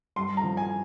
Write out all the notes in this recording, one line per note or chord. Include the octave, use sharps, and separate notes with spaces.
G2 C6
A#5
F3
G#5